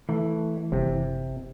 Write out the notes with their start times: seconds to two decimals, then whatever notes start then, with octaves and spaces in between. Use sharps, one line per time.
0.09 E3 A3
0.72 F#1 C3